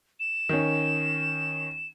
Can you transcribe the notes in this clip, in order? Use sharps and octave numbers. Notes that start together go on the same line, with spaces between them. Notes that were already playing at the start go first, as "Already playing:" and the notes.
E7
D#3 C#4